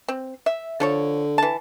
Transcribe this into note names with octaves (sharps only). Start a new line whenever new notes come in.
C4
E5
D3 F3 A4 C#5
E3 A5